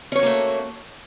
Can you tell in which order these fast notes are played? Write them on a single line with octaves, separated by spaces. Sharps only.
C#4 C#5 F#4 A#3 A3